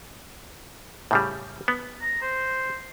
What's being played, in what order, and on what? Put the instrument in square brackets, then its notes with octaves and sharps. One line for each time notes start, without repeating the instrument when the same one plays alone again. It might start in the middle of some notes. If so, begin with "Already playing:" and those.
[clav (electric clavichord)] A2 C#3 G3
B3
[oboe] A#5
C5